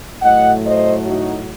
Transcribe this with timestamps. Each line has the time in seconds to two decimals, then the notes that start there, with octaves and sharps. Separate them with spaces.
0.22 A2 F#3 A3 D#5 F#5
0.65 C5 D#5
1.06 D#4 F#4